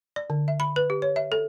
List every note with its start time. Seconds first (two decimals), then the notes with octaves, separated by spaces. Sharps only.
0.16 D5
0.30 D3
0.48 E5
0.60 B5
0.76 B4
0.90 G4
1.02 C#5
1.16 E5
1.32 A4